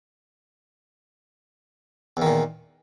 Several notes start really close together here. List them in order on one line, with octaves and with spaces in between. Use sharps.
E2 D#3 A#2